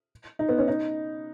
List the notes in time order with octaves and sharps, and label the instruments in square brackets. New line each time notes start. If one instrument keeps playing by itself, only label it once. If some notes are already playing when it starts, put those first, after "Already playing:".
[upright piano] D#4
B3
C#4
D#4